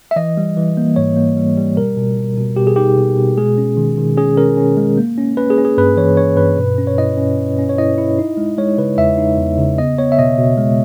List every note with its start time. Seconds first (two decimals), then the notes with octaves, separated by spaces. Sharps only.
0.11 E5
0.16 E3 D#5
0.37 G3
0.57 E3
0.77 A#3
0.96 G#2 C#5
1.16 A#3
1.37 G3
1.57 G3
1.77 B2 A#4
1.97 B2
2.17 B2
2.38 B2
2.56 B2 G4
2.67 G#4
2.76 D#4 G4
2.97 B2
3.17 B2
3.37 G#3 G#4
3.58 C#4
3.77 D#3
3.98 D#3
4.17 C#4 G#4
4.37 C#4 A#4
4.57 C#4
4.77 G#3
4.97 A#3
5.18 C#4
5.37 C#4 B4
5.50 G#4
5.58 C#4
5.65 G#4
5.78 G2 B4
5.97 E3 C#5
6.17 C#4 C#5
6.37 G2 B4
6.58 B2
6.78 C#4
6.87 C#5
6.98 E4 D#5
7.17 C#4
7.37 C#4
7.58 C#4
7.69 C#5
7.78 E4 D#5
7.98 E4
8.18 D#4
8.37 G#3
8.58 G#3 C#5
8.78 C#3 B4
8.98 E2 E5
9.18 D#4
9.38 E2
9.58 C#3
9.78 B3 D#5
9.98 B3 C#5
10.12 E5
10.18 B2 D#5
10.38 B2
10.58 G#3